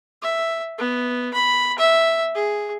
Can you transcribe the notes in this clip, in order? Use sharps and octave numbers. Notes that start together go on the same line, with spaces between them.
E5
B3
B5
E5
G#4